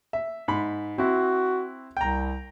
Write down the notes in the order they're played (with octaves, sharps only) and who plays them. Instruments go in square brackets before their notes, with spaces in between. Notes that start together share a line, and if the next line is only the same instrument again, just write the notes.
[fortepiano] E5
G#2 B5
[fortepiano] C4 E4 [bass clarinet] F#4
[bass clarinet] C2 [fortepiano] G5 A#5